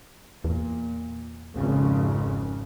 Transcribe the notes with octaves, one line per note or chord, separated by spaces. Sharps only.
E2 A#2
G#1 F2 C#3